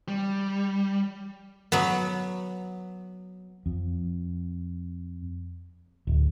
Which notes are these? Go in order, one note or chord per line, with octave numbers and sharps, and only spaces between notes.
G3
F#3 B3
F2
D1